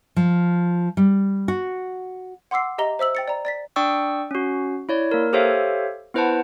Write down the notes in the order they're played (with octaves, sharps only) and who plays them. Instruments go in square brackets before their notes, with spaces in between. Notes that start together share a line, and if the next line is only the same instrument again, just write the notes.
[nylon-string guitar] F3
G3
F#4
[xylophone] F#5 C6 D6 E6 C7
G4 D#5 E5 A#5 G7
C5 E5 E6 F#7
G5 A6 C#7
D5 A#5
D5 A6 B6
[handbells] D4 D5 G5 C#6 D#6 E6
C#4 F#4
E4 C#5 D5
A#3 A#4
G4 A4 C5 C#5 E5 F5
B3 E4 B4 C5 F#5 A5